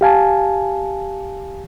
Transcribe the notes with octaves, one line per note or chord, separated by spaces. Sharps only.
G4 F5 G#5 A5